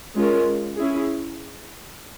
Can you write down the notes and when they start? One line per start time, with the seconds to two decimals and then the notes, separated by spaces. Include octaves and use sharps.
0.15 G#3 C#4 F4 A#4
0.76 C#4 E4 G#4